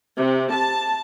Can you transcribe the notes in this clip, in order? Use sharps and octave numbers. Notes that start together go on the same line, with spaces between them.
C3
A5